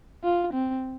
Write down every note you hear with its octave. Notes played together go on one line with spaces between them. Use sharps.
F4
C4